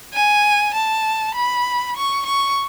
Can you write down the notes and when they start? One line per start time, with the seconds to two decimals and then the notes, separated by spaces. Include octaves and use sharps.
0.14 G#5
0.74 A5
1.35 B5
1.96 C#6
2.26 C#6